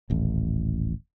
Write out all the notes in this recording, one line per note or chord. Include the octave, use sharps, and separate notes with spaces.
D#1 A1